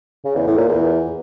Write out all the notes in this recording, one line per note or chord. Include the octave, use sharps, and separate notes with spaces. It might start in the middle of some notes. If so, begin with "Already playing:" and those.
C#3
E2
A2
A#2
E2